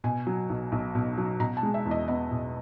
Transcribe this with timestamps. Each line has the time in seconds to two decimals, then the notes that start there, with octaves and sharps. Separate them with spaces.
0.04 B2 G#5
0.27 F#3
0.50 B1
0.72 B1
0.95 B2
1.18 F#3
1.40 B2 A#5
1.57 A5
1.63 G#3
1.74 E5
1.85 E2
1.91 D#5
2.08 B3 D#5
2.31 B2